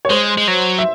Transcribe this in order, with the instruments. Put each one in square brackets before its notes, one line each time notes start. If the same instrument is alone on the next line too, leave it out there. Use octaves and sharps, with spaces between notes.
[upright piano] C#5
[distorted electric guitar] G#3 [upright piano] C5
[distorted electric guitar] G#3
F#3
[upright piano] E5